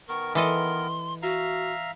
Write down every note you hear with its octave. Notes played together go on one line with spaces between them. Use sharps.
D#3 B3 A#4 C#6
E3 A4 D#5 C6
F#4 E5 F5 A#5